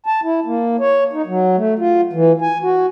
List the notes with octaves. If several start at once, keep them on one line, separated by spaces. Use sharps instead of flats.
A5
E4
A#3
C#5
D#4
F#3
A3
F4
E3
G#5
F#4